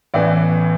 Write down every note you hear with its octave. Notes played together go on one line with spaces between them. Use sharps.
A1 A2 E3 B3 D5